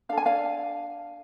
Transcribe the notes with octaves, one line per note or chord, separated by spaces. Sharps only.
D4 A4 F5
G#5
D5 F5